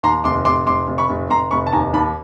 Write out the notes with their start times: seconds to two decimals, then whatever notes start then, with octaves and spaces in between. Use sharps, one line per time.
0.03 D#2 A#5 C6
0.24 F1 C6 D6
0.45 F1 C6 D6
0.66 F1 C6 D6
0.88 F1
0.98 B5 C#6
1.09 F1
1.30 F1 A#5 C6
1.51 F1 B5 C#6
1.67 A5
1.73 D#2 G#5 A#5
1.93 D#2 A5 B5